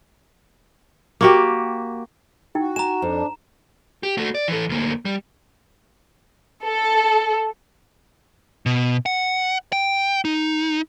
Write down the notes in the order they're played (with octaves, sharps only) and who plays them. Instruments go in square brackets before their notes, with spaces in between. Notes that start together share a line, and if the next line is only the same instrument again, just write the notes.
[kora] A#3 F#4 G4
[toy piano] D#4 E4 G5 [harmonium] F#4
[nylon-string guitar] G#5 [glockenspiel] A#5 E7
[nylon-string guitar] F2 [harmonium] D4
[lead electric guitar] G4
A3 F#4
D5
E3 A4
D2 A#3
G3
[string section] A4
[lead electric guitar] B2
F#5
G5
D#4